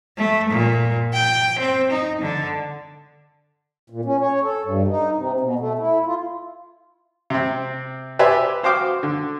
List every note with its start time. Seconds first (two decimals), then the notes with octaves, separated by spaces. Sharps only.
0.17 A3
0.50 A#2
1.13 G5
1.59 C4
1.91 D#4
2.21 D3
3.90 A#2
4.05 C#4
4.20 C#5
4.43 A4
4.65 G2
4.88 D#4
5.15 C3
5.40 B2
5.59 A3
5.79 E4
6.06 F4
7.30 C3 C4
8.19 G4 B4 C5 D5 E5 G#5
8.63 F#4 C5 F5 G5 D6
9.03 D3